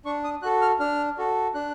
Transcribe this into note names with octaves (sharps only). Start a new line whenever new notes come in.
D4 C#6
D#6
F#4 A4 F#6
F6
D4 F6
F#4 A4
D4 F#6